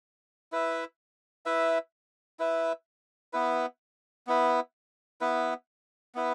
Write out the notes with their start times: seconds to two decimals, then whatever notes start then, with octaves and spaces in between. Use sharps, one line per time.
0.52 E4 B4 E5
1.46 E4 B4 E5
2.39 E4 B4 E5
3.33 B3 E4 B4
4.27 B3 E4 B4
5.21 B3 E4 B4
6.15 B3 E4 B4